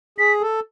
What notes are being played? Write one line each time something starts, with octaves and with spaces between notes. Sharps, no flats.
G#4 B6
A4